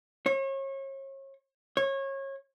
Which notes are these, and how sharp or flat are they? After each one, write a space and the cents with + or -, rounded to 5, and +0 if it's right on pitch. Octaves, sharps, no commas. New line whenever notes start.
C#5 -35
C#5 -25